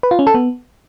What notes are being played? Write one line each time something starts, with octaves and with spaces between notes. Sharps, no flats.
B4
F4
C#4
A4
B3